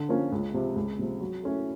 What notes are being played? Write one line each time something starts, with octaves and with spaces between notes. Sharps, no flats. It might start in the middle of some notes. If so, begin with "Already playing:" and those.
Already playing: D3
F3 A#3 C#4 F4
C#2
C3 F3
C#2
C3 F3
F#3
A3 C#4 E4